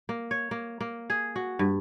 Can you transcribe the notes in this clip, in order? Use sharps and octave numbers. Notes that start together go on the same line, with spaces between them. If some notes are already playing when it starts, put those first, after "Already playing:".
A#3
C#5
A#3
A#3
G#4
F#4
G2